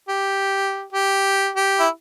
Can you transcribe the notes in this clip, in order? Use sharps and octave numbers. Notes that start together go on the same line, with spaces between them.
G4
G4
G4
E4